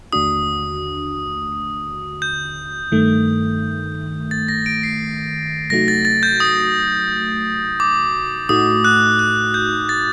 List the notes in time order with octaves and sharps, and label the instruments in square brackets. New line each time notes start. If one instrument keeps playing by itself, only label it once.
[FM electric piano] D#2 D3 A3 D4 F#4 [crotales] D#6
[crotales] G6
[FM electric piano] G2 D#3 A3
[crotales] A6
A#6
D7
C7
[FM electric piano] C3 F#3 A3 D#4 F#4 [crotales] A#6
[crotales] A6
A6
G6
D#6
D6
[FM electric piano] A2 A3 D#4 F#4 [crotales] D#6
[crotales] F#6
F#6
G6
A6